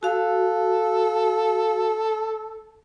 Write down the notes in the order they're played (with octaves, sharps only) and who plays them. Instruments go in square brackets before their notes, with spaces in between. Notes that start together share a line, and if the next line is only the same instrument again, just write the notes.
[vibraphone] F#4 F5 [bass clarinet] A4